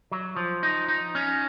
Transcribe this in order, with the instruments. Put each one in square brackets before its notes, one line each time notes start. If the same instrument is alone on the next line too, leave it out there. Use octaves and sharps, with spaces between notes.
[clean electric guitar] F#3
F3
D#4
D#4
C#4